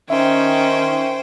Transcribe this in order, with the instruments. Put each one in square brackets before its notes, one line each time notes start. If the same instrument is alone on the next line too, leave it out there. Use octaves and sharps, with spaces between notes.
[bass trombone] D#3 [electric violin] C#4 [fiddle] C5 G5 [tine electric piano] E5